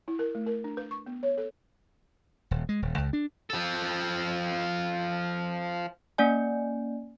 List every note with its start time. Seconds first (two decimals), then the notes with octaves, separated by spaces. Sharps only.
0.08 E4
0.19 A#4
0.35 A3
0.46 A#4
0.64 D4
0.77 B4
0.91 C#6
1.06 B3
1.23 C#5
1.38 A4
2.51 D#1
2.69 G#3
2.82 D#1
2.98 C#2
3.13 D4
3.50 F3 A4
6.18 A#3 C#4 D5 G#5